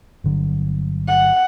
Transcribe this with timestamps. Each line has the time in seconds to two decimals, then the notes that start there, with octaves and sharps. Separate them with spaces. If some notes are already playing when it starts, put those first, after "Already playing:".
0.24 G1 D3 F#3
1.08 F#5